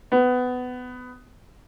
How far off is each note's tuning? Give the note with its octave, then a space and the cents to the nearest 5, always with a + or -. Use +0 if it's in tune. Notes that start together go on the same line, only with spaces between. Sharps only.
B3 +20